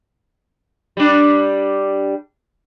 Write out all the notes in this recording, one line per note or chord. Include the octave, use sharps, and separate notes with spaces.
G3 D4